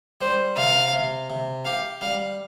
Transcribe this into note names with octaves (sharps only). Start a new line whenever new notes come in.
G3 C5
C3 F5
C3
C3
G4 F5
G3 F5